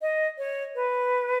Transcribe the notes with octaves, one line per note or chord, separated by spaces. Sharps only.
D#5
C#5
B4